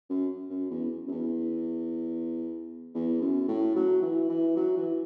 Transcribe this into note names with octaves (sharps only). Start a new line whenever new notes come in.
F#2
F#2
E2
F#2
E2
E2
F#2
A2
F#3
E3
E3
F#3
E3